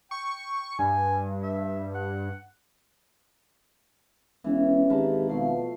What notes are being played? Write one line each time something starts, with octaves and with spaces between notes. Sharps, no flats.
G5 C#6
G2 G#5
E5
F#5
E1 E3 C#4
G#1 G#3 A#3 G4 A#4 A5 B5
B2 F3 A3 C7